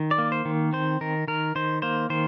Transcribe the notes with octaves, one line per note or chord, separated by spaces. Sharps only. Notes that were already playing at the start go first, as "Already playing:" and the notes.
Already playing: D#3
D5
A#3
C5
D#3
C4 C5
D#3 A#4
D#3 A#4
D#3 C5
A#3 C5
D#3 C5